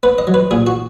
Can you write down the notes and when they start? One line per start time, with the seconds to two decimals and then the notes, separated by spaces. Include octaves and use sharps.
0.03 B3 B4
0.18 D#5
0.27 F#3
0.34 B4
0.51 A#2 G#4
0.67 F#4